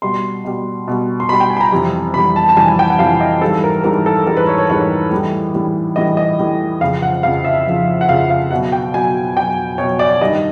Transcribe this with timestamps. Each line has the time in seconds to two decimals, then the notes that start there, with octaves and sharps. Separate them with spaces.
0.02 B2 G3 C6
0.44 B2 G3
0.88 B2 G3
1.20 C6
1.29 B2 B5
1.33 G3
1.40 G5
1.50 G#5
1.57 B5
1.61 A#5
1.72 F2 C3 E3 G3
2.14 F2 C3 E3 G3 B5
2.36 A5
2.49 A5
2.57 F2 C3 E3 G3 G#5
2.79 G5
2.90 F#5
2.99 F2 C3 E3 G3 F5
3.21 D#5
3.41 G#2 E3 G3 A4
3.64 A#4
3.84 G#2 E3 G3 A#4
4.06 A4
4.26 G#2 E3 G3 A#4
4.37 B4
4.47 C#5
4.58 C#5
4.70 G#2 E3 G3 C#5
5.11 A2 E3 G3
5.54 A2 E3 G3
5.96 A2 E3 G3 D#5
6.17 D#5
6.39 A2 E3 G3
6.81 F2 C#3 F3 F5
7.02 F#5
7.23 F2 C#3 F3 F5
7.44 E5
7.67 F2 C#3 F3
8.01 F#5
8.09 F2 C#3 F3 F5
8.30 F5
8.51 B2 F#3 F#5
8.72 G5
8.94 B2 F#3 G#5
9.37 B2 F#3 G5
9.78 B2 F#3 C#5
9.99 D5
10.21 G2 D#3 G3 D#5